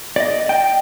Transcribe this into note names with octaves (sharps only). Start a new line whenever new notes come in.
D5 D#5
G5